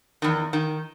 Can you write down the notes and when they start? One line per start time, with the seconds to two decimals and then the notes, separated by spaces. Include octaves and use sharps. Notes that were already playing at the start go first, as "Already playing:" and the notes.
0.22 E2 D#3
0.53 D#3